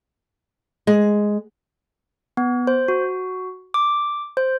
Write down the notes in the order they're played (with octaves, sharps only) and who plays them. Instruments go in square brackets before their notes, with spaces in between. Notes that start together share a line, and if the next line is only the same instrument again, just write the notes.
[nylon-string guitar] G#3
[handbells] B3
C5
F#4
D6
C5